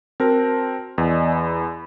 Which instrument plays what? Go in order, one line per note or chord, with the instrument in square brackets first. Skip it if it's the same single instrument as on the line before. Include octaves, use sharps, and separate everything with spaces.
[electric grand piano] C4 A#4 [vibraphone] F#4 A5
[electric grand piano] E2 [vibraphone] D5 D#5 G#5
[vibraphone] B5